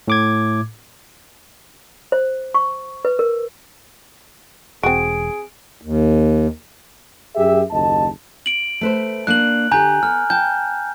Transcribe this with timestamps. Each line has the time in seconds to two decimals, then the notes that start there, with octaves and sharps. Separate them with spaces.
0.08 A2 D6 G#6
2.12 C5
2.54 C#6
3.05 B4
3.19 A#4
4.83 E1 C4 F#4 G#4 D7
5.81 D#2
7.36 F#2 G4 G#4 E5
7.71 F#1 D#2 D#5 A5
8.46 D7 F#7
8.81 A3 B4 C5
9.27 A#3 D4 D5 F#6 F#7
9.71 D3 G4 G#5 A#5 G6
10.03 B3 F6
10.30 G5 A5 G6